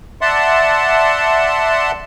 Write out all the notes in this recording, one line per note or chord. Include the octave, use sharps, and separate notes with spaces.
D5 E5 F#5 A5 C6